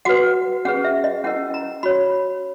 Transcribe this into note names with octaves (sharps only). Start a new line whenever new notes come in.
F#4 B4 F#5
C#4 G#4 B4 F#5
E5
D#5
C#4 E4 A#4 F#5
A#5
F#4 C#5 B5